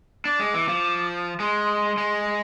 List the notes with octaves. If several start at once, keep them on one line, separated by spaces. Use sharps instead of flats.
D4 D6
G#3
E3
F3
G#3 C6
G#3